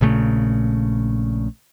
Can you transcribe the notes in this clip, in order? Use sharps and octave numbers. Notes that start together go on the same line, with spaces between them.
A#1 A#2 C#3 A3